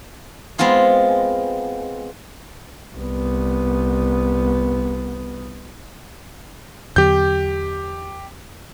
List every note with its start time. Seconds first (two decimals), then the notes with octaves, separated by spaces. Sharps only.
0.58 G#3 B3 C4 F4 G#4
2.95 C2 B3
6.96 E2 D3 F#3 G4 G6